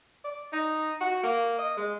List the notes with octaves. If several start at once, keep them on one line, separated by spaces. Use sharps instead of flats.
D5
D#4
F#4
A#3
D#5
G#3